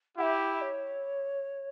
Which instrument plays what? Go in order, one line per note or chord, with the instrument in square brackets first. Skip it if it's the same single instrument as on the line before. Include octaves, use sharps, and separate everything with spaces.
[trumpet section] E4 G4 [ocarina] F#5
[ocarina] E5
C#5